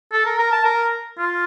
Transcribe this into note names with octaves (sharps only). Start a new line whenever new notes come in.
A4
A#4
A#4
A5
A#4
F4